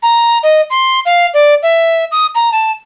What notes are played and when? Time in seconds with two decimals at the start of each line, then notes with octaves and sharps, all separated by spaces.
0.03 A#5
0.43 D#5
0.70 C6
1.06 F5
1.34 D5
1.63 E5
2.12 D#6
2.35 A#5
2.52 A5